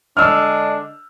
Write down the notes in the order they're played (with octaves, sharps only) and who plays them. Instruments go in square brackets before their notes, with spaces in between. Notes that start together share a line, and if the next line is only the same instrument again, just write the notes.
[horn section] D3 G#3 D4 [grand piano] E6 F6